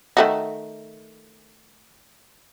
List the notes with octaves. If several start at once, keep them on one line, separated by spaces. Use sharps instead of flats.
D#3 A3 F#4